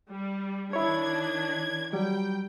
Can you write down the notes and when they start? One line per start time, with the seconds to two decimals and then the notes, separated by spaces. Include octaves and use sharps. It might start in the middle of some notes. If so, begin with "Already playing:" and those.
0.10 G3
0.73 D#3 D4 E4 C#5 G#6
1.93 F#3 G3 G5